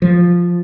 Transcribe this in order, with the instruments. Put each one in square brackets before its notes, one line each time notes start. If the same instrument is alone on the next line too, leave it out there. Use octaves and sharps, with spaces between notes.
[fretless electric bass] F3